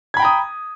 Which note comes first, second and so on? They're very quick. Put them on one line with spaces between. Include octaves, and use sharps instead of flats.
G#6 B5 G5 A#5 D#6